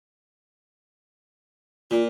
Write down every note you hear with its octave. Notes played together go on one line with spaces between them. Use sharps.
A#2 F4